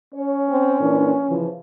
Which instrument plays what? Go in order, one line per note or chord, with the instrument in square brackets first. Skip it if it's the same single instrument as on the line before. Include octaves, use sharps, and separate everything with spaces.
[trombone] C#4 [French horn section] C#5
[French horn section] C4
A#2 E3 D4
C#3 E3 F3